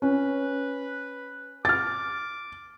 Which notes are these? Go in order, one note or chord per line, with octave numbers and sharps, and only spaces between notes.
C#4 B4
D6 F6 A6